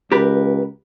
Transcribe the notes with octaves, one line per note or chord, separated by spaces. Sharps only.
C#2 G4 A#4 B4